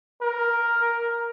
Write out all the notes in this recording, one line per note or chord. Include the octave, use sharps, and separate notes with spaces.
A#4